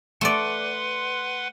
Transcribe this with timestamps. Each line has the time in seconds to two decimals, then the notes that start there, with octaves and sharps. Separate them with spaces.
0.21 A3 B4 D5 F#5 C6